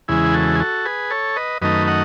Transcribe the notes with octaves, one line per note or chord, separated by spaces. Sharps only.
E2 C#3 E3 G#3 E4 G#4
F#4 A4
G#4
F#4 A4
G#4 B4
A4 C#5
B4 D#5
F#2 D#3 A3 D#4 B4 D#5
D#5 F#5